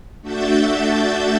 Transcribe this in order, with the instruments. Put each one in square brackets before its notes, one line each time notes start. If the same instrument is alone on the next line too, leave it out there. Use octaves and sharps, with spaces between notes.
[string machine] A3 D4 F#4 E5 G6 A6